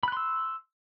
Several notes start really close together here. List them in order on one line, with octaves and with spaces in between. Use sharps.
B5 F#6 C6 E6